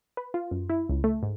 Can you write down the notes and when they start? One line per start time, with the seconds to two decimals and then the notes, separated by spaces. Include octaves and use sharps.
0.17 B4
0.34 F4
0.51 F#2
0.70 E4
0.89 C#2
1.04 A3
1.23 G#2